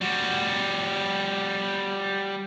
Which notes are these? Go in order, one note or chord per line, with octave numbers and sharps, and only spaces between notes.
G3 F#4